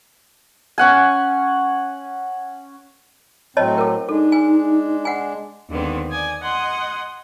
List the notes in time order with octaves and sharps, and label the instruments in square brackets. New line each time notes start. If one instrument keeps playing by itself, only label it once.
[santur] C#4 F#5 G#5
[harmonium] A2 F#3 C4 [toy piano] C#5 D#5 A5
[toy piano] A4 A#4
[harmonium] G#3 D4 [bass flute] D#4 [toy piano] A4
[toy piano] G#5
F#5 G#5
[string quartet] D#2 D3 D#3 G#3 B3 C4
D5 G#5 D#6
D#5 F#5 C6 G#6